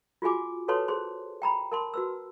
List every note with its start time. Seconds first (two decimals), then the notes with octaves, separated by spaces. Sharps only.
0.22 F4 F#4 G#4 G#5 D6
0.68 F#4 A4 B4 C#5 A5 C6
0.88 G#4 C5 C6
1.42 G5 A#5 B5
1.72 A#4 A5 C6
1.94 F#4 B4 E6